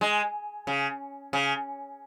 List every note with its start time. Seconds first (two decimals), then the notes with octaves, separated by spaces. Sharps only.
0.01 G#3
0.67 C#3
1.33 C#3